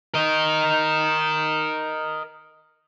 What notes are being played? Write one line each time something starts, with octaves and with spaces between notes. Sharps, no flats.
A#4 D#5